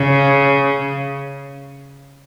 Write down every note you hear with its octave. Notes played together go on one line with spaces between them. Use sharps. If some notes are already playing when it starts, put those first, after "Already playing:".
Already playing: C#3